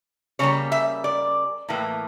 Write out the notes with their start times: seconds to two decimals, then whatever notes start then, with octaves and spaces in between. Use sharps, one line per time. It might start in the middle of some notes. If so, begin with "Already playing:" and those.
0.39 C#3 G3 A#3 C#5
0.72 E5
1.04 D5
1.69 A2 E3 A#3